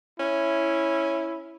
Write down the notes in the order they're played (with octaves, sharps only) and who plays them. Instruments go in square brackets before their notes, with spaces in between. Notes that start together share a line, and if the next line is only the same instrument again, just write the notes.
[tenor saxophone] C#4 [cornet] E4